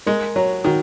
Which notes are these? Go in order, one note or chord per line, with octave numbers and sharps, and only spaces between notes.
G#3 A#4
F#3 C#5
D#3 F#4